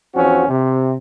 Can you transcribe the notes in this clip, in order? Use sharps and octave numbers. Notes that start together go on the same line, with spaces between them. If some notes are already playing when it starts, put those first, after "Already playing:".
E2 F3 C4 C#4 F#4
C3